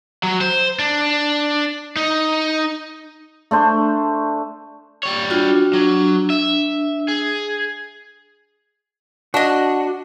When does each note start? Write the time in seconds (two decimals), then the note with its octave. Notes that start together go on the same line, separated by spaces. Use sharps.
0.23 F#3
0.41 C5
0.79 D4
1.96 D#4
3.51 A3 D4 C5
5.03 G3 C#5
5.30 D4 F4 F#4
5.73 F#3 D4
6.30 E5
7.08 G#4
9.34 D4 F#4 D#5